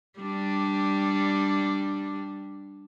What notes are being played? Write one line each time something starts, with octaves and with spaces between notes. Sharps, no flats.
G3 D4